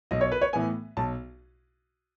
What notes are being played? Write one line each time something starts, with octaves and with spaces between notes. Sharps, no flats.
B1 D#5
C#5
B4
C#5
A2 E3 B3 G#5
B1 A5